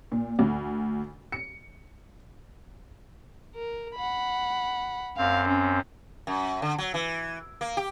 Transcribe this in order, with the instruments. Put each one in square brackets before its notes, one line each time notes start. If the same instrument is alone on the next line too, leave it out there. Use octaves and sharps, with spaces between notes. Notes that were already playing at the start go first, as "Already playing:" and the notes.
[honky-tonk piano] A#2
D2
C#7
[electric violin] A#4
F#5 B5
[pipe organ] F#2 C4 [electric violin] F5
[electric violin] C#4
[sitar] F#2
D3
F#3
E3
A#3
G4